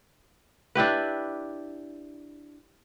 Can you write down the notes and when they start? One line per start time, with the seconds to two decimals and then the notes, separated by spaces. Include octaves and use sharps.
0.75 D4 E4 G4 B4